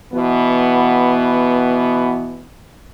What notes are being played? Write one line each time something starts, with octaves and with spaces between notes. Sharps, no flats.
B2 E3 B3